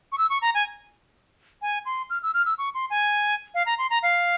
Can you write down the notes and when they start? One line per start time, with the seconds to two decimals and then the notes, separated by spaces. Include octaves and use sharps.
0.12 C#6
0.18 E6
0.30 C#6
0.42 A#5
0.55 G#5
1.62 G#5
1.86 C6
2.10 F6
2.23 E6
2.34 F6
2.46 E6
2.58 C#6
2.74 C6
2.90 G#5
3.54 F5
3.66 A#5
3.78 C6
3.90 A#5
4.03 F5